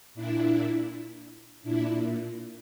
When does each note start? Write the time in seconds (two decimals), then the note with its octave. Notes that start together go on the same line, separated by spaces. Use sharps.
0.14 A#2 D4 E4
1.63 A#2 D4 E4